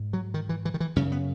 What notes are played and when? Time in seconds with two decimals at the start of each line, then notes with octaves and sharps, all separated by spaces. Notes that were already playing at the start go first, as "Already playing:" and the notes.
Already playing: G#2
0.13 F#3
0.34 D#3
0.49 E3
0.65 E3
0.74 D#3
0.80 E3
0.96 F#2 C#3 C#4
1.12 B3